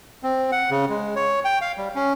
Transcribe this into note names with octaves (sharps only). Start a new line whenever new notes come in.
C4
F#5
C#3
G#3
C#5
G5
F5
G3
C#4